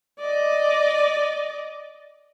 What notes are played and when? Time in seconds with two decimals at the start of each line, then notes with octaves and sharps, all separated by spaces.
0.20 D5 D#5